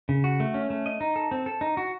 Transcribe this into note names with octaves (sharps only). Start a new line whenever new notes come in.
C#3
F#4
A3
C#4
A3
D#5
D#4
A4
C4
A4
D#4
F#4